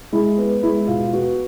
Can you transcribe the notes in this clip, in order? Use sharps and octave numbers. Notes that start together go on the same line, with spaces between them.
G#3 E4
B3
G#3 E4
B2 F4
B3 F#4